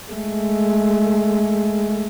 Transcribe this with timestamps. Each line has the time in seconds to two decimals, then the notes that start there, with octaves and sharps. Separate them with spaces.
0.12 G#3 A3